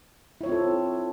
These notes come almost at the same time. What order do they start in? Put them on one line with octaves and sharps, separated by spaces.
E4 C#5 F4 C4 A4